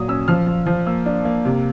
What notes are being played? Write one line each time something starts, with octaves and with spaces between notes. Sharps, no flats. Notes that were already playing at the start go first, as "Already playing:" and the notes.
Already playing: A#2 F#3 D#6
C#4 E6
F3 F6
F3
F3
A#3 E6
D4
A#3
C3